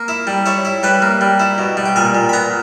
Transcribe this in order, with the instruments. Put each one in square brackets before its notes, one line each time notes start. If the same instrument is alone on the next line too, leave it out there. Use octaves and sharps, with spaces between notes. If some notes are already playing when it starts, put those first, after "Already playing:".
Already playing: [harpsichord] A#3
E4
G3
E4 C#5
E4
G3 B4
A#3
G3
E4
B2
G3
G5
A#2 G#5
A#2
B5
B3 A#5